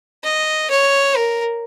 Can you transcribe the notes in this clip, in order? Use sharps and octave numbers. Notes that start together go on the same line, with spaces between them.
D#5
C#5
A#4